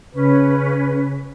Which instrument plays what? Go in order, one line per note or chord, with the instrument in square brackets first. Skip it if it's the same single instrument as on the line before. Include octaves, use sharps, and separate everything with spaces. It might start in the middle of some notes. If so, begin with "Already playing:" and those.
[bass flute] C#3 [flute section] C#4 B4